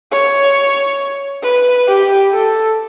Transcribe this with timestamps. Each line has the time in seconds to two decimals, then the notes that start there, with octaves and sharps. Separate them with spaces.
0.12 C#5
1.43 B4
1.88 G4
2.32 A4